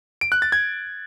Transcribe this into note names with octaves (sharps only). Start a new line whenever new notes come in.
D7
F#6
A6
G#6